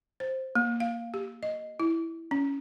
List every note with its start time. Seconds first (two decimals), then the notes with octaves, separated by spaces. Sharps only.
0.20 C5
0.55 A#3
0.80 F5
1.14 G4
1.43 D#5
1.80 E4
2.31 C#4